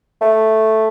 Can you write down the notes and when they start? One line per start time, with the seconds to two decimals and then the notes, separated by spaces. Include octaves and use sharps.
0.21 A3